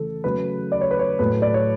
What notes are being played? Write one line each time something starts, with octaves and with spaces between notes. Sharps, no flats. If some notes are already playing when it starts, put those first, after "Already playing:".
Already playing: C#3 E3 A3 A4
C#3 F#3 A3 B4
D5
C#5
B4
C#5
A2 F#3 A3 B4
D5
C#5